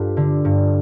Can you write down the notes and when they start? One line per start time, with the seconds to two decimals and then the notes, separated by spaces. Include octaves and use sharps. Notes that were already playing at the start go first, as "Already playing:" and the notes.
Already playing: G2 F4 G4 A4 B4
0.17 D3
0.45 G2